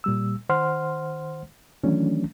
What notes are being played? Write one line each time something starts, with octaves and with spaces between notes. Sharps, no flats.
A#2 G3 E6
D#3 C5 F#5 C6 F6
D#3 E3 F#3 A3 C#4 D4